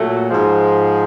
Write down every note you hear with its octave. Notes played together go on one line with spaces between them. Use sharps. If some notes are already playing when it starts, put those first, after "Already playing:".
Already playing: A#2 F#3 A3
G#2 F3 G#3